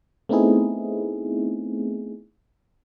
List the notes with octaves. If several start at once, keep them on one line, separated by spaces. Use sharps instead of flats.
A3 B3 C4 D#4 E4 G#4